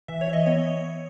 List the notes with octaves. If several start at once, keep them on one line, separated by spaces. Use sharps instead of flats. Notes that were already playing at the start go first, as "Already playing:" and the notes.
E3 E5
C#5
E3 E5
D#5
B3 C#5